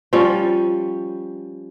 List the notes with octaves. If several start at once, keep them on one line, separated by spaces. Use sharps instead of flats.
F3 G3 C#4